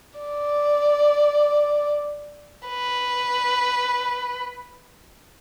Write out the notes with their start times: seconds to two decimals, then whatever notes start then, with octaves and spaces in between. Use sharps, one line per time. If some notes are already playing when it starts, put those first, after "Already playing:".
0.19 D5
2.67 B4